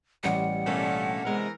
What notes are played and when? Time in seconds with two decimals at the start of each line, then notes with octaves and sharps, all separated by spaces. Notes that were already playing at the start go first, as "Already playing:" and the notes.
0.24 A1 G3 F#5
0.66 B2 A3 A#3 C#4 D4
1.25 C3 E3 G#3 B3 A#4